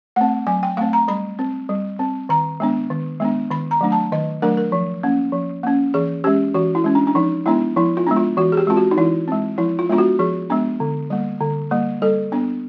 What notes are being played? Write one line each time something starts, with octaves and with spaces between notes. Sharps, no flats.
A3 C4 F#5
F#3 G#5
G5
A3 C4 F5
A#5
G3 B5
C4
G3
C4
D#3 A#5
G#3 B3 D4
D#3
G#3 B3 D4
D#3 B5
A#5
F#3 A3 D4
A5
D#3 D#5
F#3 A3 D4 A#4
A#4
F3
A#3 C#4
F3
A#3 C#4
E3 G#4
G#3 C#4 G4
E3 F#4
E4
G#3 C#4
D4
D4
F3 D#4
G#3 B3 D4 E4
F3 E4
F4
G#3 B3 D4
F4
E3 F#4
G#4
G4
G#3 C4 F4
F#4
D#4
E3 E4
G#3 C4
F3 E4
F4
G#3 B3 D4 F4
F#4
F3 G#4
G#3 B3 D4
D3
G3 A#3
D3
G3 A#3
G3 A4
B3 D4